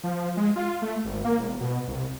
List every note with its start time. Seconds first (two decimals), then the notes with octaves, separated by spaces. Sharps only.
0.03 F3
0.37 G#3
0.56 F4
0.82 A3
1.05 G#1
1.24 A#3
1.38 E1
1.60 B2
1.87 C2